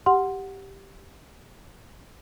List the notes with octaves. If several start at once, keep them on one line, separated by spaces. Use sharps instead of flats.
G4 F#5 C6